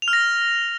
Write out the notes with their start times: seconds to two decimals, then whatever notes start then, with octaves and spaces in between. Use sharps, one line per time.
0.02 F7
0.08 F6
0.13 A#6